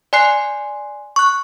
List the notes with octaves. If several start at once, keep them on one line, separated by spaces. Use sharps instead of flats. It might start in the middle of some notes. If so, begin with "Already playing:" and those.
D5 G#5 C6 F#6 C7
C#6 F#6